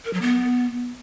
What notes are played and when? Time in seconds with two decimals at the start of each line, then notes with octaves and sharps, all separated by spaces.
0.05 A#4
0.13 F#3
0.22 B3